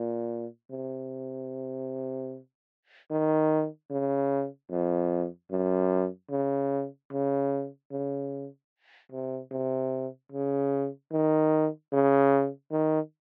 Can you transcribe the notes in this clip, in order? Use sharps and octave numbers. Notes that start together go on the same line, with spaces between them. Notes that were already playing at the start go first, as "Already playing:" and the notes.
Already playing: A#2
C3
D#3
C#3
F2
F#2
C#3
C#3
C#3
C3
C3
C#3
D#3
C#3
D#3